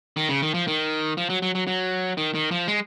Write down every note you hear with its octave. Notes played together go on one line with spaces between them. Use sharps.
D#3
C#3
D#3
F3
D#3
F3
F#3
F#3
F#3
F#3
D#3
D#3
F3
G#3